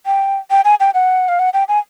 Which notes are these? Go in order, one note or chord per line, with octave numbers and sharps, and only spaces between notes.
G5
G5
G#5
G5
F#5
F5
F#5
G5
G#5